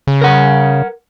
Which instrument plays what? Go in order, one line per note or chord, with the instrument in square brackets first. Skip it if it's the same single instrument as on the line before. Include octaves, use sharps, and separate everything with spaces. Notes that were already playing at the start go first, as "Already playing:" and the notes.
[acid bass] C#3
[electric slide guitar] A#4 F#5